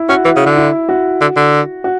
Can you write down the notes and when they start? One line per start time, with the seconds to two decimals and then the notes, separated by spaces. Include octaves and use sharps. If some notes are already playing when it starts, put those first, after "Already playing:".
Already playing: E4
0.09 C#4 F#4
0.25 E3 E4
0.36 C#3
0.46 D3
0.57 E4
0.89 F#4
1.21 D3
1.36 D3
1.84 F#4